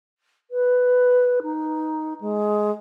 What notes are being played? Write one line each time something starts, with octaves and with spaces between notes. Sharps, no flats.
B4
D#4
G#3